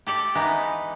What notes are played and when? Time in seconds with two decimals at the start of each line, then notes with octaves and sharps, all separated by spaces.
0.07 G4 A4 D5
0.35 E3 G#3 B3 D#4